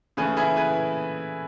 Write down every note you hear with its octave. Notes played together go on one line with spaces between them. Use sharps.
C#3 E3 A3 G#4 B4
E4 G#4
G#4 B4